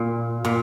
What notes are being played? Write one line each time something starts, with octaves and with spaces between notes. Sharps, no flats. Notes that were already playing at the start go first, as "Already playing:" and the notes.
Already playing: A#2
A#2